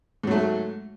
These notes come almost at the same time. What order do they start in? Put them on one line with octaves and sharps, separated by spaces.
G#2 F#3 A3